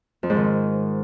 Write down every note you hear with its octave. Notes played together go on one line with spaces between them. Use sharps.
F2
G#2
D#3